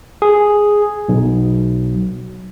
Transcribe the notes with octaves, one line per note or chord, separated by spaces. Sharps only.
G#4
B1